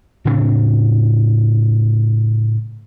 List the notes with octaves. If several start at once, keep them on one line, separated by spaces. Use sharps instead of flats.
A2 C#3 C4 D4